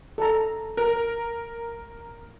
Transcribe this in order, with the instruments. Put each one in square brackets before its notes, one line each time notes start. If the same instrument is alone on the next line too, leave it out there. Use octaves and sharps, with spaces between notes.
[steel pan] A4 A#5
[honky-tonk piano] A#4